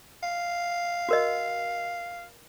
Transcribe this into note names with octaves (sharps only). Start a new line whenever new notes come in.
F5
F#4 A#4 D#5